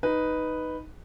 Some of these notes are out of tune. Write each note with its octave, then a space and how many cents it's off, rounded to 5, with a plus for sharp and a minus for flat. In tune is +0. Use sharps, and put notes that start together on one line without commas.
D#4 +0 B4 +0